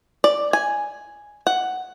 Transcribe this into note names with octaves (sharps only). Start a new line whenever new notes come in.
D5
G#5
F#5